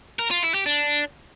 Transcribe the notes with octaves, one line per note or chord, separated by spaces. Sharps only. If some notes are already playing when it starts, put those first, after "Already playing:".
A#4
F4
E4
G4
D4